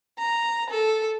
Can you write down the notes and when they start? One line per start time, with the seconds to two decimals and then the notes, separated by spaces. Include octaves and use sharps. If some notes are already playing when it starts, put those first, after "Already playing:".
0.18 A#5
0.70 A4